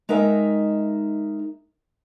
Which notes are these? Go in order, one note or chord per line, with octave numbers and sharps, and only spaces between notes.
G#3 D#4 A#4 E5 G5